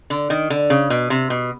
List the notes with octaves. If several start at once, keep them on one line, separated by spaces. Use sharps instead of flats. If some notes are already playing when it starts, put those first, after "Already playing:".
D3
D#3
D3
C#3
B2
C3
B2